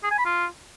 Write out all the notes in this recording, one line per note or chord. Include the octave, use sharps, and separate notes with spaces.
G#4
G#5
B5
F4